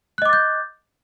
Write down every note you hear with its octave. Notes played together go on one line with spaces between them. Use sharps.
D#5 D6 F#6 G6 A6